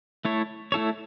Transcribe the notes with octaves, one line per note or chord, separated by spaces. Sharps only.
A3 E4 A4 C#5
A3 E4 A4 C#5